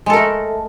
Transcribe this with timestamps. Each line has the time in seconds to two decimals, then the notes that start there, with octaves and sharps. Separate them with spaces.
0.06 G#3
0.10 A4
0.13 A#4
0.17 A3